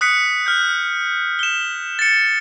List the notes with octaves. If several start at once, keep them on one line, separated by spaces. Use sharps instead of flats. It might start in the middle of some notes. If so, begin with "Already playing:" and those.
D#6 F#6 B6 C#7
F6 G6
E7 G7
A6 C#7